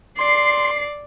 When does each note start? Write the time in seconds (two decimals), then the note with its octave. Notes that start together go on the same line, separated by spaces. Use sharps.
0.19 D5 C6 C7